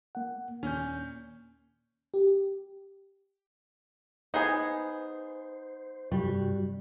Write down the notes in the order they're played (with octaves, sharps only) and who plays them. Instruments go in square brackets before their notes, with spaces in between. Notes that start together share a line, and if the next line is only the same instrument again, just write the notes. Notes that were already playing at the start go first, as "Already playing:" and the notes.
[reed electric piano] A#3 F#5
[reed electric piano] D#2 G6 [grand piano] A#2 C#4
[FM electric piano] G4
[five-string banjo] B3 G#4 G#5 [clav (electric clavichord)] D#4 [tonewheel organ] C5
[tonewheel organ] G2 C3 F#4 [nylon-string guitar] G3